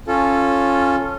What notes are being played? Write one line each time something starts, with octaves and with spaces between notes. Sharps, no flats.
C#4 F4 A4